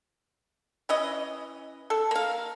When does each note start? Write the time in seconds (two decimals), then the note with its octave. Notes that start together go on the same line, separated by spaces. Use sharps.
0.89 E3 C#4 D#5
1.90 A4
2.11 A#3 F5